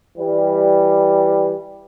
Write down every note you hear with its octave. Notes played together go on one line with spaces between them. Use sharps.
E3 G3